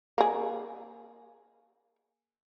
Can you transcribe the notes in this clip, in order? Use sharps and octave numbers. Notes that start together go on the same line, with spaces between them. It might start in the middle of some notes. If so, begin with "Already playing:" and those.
A#3 G#4